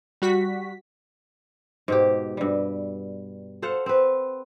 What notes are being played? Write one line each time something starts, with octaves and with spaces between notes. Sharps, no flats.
G3 F#4 B6
G#2 B2 G4
G2 G3
A4 C5 F5 F#5
C4 B4